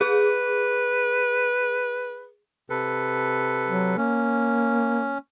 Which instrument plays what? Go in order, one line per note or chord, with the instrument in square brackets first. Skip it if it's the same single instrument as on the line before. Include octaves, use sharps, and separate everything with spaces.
[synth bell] G#4 [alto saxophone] B4
[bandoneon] C3 A4 B4
[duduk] F#3
[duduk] A#3 [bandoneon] C#4